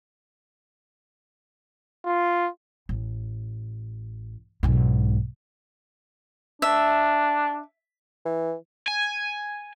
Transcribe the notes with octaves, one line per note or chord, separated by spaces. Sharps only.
F4
A1
B1 G#2
D4 E5
E3
G#5